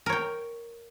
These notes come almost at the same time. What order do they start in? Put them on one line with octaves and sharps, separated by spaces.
A#4 C#5 G5